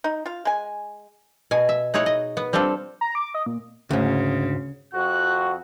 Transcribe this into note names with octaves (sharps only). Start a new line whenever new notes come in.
D#4
F4 F5
G#3 G#5
B2 G#5
E5
D#4 E4 G#4 C#5 F#5
D#5
B3
G3 C4 D4 F4 A4
A#5
D6
D#5
A#2
D2 G#2 C#3
F2 F#4 F#6